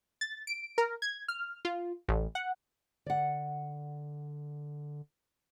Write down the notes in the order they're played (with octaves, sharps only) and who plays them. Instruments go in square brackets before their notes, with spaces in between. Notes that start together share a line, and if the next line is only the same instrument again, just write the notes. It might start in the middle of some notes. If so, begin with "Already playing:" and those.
[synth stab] A6
D7
A#4
G#6
F6
F4
A1
F#5
[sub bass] D3 [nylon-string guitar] D5 F#5